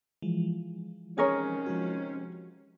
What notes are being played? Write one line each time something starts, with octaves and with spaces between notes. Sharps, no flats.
E3 F3 G#3
C3 D#3 C#4 G#4 A#4 C#5
F3 G#3 F#4